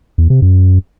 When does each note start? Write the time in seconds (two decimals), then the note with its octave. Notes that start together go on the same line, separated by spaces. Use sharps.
0.18 E2
0.30 C3
0.42 F#2